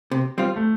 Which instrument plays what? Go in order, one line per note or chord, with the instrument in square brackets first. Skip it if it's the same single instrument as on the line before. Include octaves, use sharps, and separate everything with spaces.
[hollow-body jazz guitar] C3
G3 C4 F4
[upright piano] A3